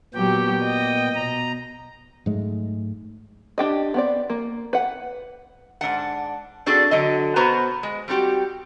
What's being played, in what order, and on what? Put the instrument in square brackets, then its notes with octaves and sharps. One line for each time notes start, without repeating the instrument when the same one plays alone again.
[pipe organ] A#2 B3 G5 [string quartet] F#3 G4
[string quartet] D#5
[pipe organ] B2 A#5
[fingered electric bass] G#2 F#3 G#3 A3
[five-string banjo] D4 G4 D#5
B3 C4 D5
A#3
B4 F#5
[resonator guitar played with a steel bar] G#2 B3 D4 F#5
C4 D4 F#4 G#4 A4 D5
D3 F#3 D#5
B2 B3 F#4 B4 C5 A#5
G#3
G3 C4 F#4 G4